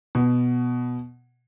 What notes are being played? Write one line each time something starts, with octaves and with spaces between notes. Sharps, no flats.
B2